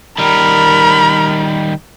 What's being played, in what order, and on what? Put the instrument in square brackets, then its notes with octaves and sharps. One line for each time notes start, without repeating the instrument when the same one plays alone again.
[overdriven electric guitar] D#3 G3 [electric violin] A#4 [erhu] B5